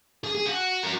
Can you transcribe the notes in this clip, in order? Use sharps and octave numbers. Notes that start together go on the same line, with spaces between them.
G#4
G#4
F#4
A#4